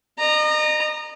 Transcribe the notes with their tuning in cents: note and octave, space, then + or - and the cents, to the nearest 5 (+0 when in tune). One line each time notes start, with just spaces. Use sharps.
D#5 -40 A#5 -5